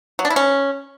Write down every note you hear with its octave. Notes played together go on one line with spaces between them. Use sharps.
F#3
D4
E4
C#4